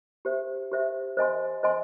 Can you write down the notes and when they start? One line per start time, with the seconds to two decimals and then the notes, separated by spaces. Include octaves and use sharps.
0.25 G4 C5 E5
0.71 G4 C5 E5
1.17 C5 D#5 G#5 C6
1.63 C5 D#5 G#5 C6